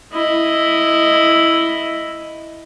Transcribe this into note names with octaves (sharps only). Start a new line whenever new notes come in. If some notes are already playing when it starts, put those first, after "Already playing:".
E4 D#5